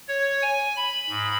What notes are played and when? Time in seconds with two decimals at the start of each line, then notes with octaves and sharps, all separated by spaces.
0.08 C#5
0.42 G#5
0.76 B5
1.09 G#2